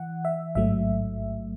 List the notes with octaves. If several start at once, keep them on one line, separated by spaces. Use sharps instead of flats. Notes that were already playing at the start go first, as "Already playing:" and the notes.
Already playing: E3 F#5
E5
A1 G#2 F#3 A3 E5